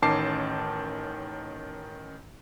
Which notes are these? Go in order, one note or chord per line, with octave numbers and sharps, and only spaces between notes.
A1 D#3 C#4 A5 D6 C7